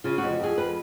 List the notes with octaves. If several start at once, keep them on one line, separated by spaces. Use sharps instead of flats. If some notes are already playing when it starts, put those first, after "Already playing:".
C#3 F4
F2 F#4
F2 G#4
F2 B4